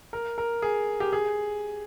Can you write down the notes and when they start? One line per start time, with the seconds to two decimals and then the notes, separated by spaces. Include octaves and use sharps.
0.13 A#4
0.38 A#4
0.62 G#4
1.00 G4
1.13 G#4